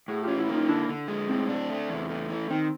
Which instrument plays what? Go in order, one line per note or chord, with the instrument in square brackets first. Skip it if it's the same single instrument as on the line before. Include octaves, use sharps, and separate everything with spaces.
[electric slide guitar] A2 [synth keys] F#4 G#4
[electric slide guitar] C#4 [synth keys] F4 G4
[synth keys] E4 F#4
[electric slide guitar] A#3
[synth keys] D#4 F4
[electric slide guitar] D3 [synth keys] D4 E4
[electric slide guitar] D3
G#3
[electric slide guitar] A2 [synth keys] C4
[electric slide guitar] D4
A3
E2
A3
E3
[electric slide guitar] D#3 [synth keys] C4